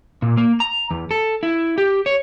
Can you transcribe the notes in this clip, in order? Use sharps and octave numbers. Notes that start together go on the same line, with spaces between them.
A#2
A#3
A#5
E2
A4
E4
G4
C#5